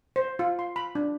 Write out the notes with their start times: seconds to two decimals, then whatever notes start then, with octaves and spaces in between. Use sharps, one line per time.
0.16 C5
0.39 F4
0.59 C6
0.76 B5
0.95 D4